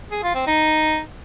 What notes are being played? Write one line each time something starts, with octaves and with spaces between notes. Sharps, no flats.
G#4
F4
C4
D#4